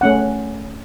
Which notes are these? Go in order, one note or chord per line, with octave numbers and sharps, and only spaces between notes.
A3 C#4 F#5